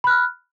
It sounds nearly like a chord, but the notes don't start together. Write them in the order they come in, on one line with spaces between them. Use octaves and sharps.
B5 F#6 F6